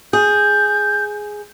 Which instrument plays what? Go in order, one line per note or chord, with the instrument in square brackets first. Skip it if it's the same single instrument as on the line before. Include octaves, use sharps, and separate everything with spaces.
[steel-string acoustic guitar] G#4 [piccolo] G6